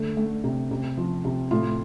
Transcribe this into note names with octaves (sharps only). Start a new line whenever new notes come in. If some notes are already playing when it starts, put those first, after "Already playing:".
Already playing: D3 A3
A3
C3
C3
F3
C3
A2 F4